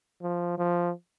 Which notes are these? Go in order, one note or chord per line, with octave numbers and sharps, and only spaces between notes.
F3
F3